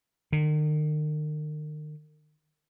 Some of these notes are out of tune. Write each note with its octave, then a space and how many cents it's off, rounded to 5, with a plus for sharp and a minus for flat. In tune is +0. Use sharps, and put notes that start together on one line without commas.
D#3 -40